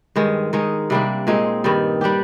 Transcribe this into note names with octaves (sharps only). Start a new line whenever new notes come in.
G2 D#3 G#3
D#3 G#3 D#4
C3 G3 A#3 D4
A#2 G#3 C4 D#4
G2 D#3 G3
G3 D4 G4